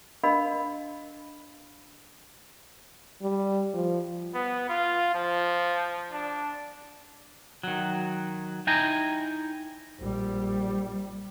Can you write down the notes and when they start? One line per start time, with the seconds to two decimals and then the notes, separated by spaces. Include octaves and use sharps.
0.24 D4 A#4 D#5 F5 B5
3.22 G3
3.74 F3
4.35 B3
4.69 F4
5.15 F3
6.12 D4
7.63 D#3 F#3
8.67 D#4 E4 G5 G#5 A#5
9.99 A#1 G3